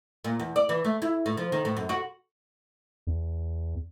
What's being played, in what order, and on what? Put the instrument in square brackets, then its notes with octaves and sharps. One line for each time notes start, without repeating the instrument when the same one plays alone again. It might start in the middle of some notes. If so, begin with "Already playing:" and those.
[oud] A#2
E2
D5
E3
A3
E4
A2
F3
D#3
A2
F#2
F#4
[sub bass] E2